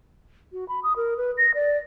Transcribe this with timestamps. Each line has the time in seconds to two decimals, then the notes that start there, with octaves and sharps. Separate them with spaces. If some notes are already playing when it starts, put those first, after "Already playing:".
0.53 F#4
0.69 B5
0.83 D#6
0.96 A#4
1.17 B4
1.38 A#6
1.55 D5